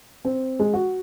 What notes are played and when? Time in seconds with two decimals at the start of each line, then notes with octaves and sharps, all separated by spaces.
0.25 C4
0.59 G#3
0.74 F#4